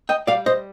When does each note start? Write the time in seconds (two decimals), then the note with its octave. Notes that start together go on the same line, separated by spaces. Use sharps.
0.09 D#5 G5
0.27 G3 D5 F5
0.46 C5 D#5